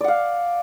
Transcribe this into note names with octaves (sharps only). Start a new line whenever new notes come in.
D5 F5 F#5